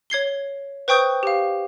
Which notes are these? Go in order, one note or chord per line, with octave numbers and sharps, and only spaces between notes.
C#5 G#6 C7 G7
B4 C5 G5 C#6 D#6 G6
G4 F5